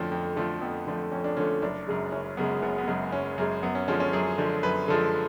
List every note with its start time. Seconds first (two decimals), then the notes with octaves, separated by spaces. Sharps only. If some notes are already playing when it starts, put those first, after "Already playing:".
Already playing: F2 D3 F3 A3 C#4
0.12 F2
0.36 D3 F3 A3
0.61 F2 B3
0.87 D3 F3 A3
1.11 F2 C#4
1.24 D4
1.37 D3 F3 A3 C#4
1.62 F#1 D4
1.87 F#2 C#3 G#3
2.12 F#1 C#4
2.37 F#2 C#3 G#3 B3
2.62 F#1 B3
2.78 B3
2.87 F#2 C#3 G#3
3.12 F#1 C#4
3.38 F#2 C#3 G#3
3.63 F#2 B3
3.75 C#4
3.88 D3 F3 G#3 C#4
4.00 C#4
4.13 F#2 G#4
4.38 D3 F3 G#3
4.63 F#2 B4
4.88 D3 F3 G#3 A4